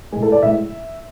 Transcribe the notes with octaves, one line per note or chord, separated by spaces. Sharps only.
A2 G#3 G#4
A4
D5
A2 G#3 E5